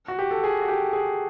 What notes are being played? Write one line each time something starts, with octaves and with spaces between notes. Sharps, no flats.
F#4
G4
A4
G#4
F#4
G4
G#4